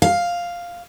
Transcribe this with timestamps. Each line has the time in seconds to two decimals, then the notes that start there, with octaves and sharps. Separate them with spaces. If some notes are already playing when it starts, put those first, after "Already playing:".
0.02 F5